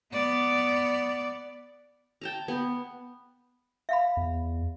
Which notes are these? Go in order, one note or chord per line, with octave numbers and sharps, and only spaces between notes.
B3 D5
G5 A5 A#5
B3
E5 F5 B5
E2